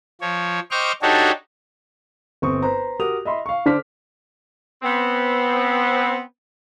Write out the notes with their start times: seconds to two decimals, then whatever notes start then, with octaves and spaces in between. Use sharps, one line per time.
0.21 F3 C#5
0.71 C5 D#5 G5 C#6 D6 F6
1.02 D4 D#4 F#4 G4 A4 C#5
2.42 G1 C4 C#6 D#6
2.62 B4 C5 A#5
2.99 F#4 G4 A#4 D#6 F7
3.25 D#5 E5 B5 C6
3.46 F5 C#6
3.66 D3 D4 C5 D6 F6 B6
4.82 B3 C4